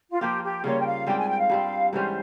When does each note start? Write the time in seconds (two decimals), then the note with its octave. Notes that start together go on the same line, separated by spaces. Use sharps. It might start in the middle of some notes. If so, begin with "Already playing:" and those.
0.10 F4
0.21 F3 A#3 F4 G4
0.43 G4
0.64 C#3 G3 A#3 F4 C#5
0.79 G5
0.86 F5
1.07 G#2 G3 C4 G4 G5
1.18 G#5
1.29 G5
1.39 F5
1.50 G2 G3 C4
1.93 G#2 E3 G3 C#4 C5